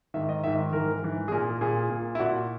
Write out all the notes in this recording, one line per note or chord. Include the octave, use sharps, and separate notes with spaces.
G#2 D#3 E5
D#5
G#2 D#3 E5
G#2 E3 A#4
G#2 E3
G#4
A#2 A#4
A#2 G#4
A#2
E4
A#2 F#4